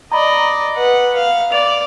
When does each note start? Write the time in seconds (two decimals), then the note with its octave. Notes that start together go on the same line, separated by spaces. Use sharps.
0.12 D5 D#5 A#5 B5
0.76 B4 F#5
1.15 F5
1.52 D5 F7